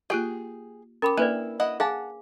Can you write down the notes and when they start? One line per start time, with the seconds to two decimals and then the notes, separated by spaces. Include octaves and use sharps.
0.10 A#3 F4 G4 G#4 G5
1.02 C#4 A#4 G5 B5 D6
1.17 A#3 D4 E4 B4 D5
1.60 E4 D#5 F#5
1.80 G#4 F5 F#5 G#5 A5